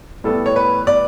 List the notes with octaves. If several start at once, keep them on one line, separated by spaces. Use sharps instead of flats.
A2 G3 B3 A4
C#5
B4
D5